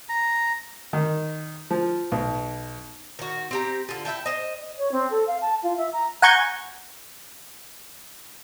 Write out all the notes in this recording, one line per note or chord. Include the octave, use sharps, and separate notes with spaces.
A#5
D#3
F3
B1
D#3 F#4
C4 G4 A#5
D3 F4
E4 E5 G5 A5
C5 D#5
C#5
C4
A4
F5
A5
F4
E5
A#5
F#5 G#5 A#5 C#6 G6 G#6